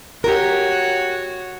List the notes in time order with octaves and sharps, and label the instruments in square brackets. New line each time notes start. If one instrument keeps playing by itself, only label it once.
[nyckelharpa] F#4 C#5 [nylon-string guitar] G4 A#4